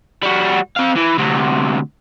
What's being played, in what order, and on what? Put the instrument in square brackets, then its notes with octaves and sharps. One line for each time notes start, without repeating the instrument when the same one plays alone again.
[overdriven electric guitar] G3 F#4
C4 F5
E3
D2 C3